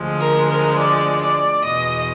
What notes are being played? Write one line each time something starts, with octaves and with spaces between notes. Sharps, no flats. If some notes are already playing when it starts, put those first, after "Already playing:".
Already playing: D2 D3 F3 G#3
A#4
A#4
D5
D5
E2 B2 G#3 D#5